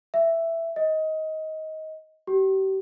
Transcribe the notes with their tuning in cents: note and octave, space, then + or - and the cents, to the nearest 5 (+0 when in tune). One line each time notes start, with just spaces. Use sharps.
E5 +5
D#5 +20
G4 -35